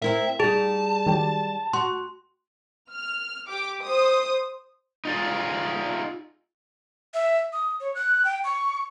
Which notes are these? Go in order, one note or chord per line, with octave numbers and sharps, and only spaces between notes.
C4 E4 A#4 E5
G3 D#4 G#4 A5
D#3 F#3 G4
F#4 C6
F6
G4 D6
C5 D#6
D#4 F4 G#4
E5
D#6
C#5
F#6
G5
C#6